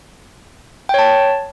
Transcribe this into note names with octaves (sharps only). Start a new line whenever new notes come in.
C#5 G5 A5